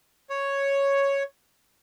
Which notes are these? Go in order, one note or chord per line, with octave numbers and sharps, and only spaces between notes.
C#5